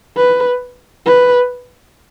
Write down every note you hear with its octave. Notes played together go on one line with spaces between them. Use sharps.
B4
B4